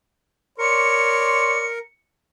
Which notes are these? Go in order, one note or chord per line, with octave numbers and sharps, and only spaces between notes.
A#4 C#5 D5 C6 C#7